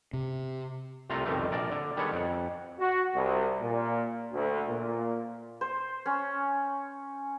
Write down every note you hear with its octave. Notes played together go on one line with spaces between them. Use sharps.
C3
C2 C3 A3 F4 A#5
C2 F2 B2 D#3 G3 A3
A#1 A#4 D5 A5
D3
D#3 G3 G#3 B3 A4 C#5
F2 F#5
F#4
C2
A#2
D2
A#2
C5
C#4